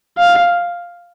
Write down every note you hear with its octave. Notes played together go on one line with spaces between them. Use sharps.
F5